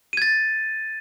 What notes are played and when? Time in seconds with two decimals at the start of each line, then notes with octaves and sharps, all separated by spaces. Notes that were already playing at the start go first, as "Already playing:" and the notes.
0.13 D#7
0.17 G#6
0.22 A6